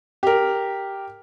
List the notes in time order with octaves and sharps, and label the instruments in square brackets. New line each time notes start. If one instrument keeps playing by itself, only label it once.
[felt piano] G4 A#4